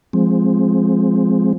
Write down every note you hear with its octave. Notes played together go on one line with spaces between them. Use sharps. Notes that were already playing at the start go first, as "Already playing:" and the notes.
F3 G#3 C4